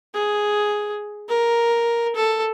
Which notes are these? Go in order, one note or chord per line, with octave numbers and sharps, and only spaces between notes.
G#4
A#4
A4